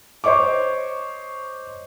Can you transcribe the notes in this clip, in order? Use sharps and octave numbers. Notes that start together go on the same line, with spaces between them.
C5 C#5 D#5 C#6 D6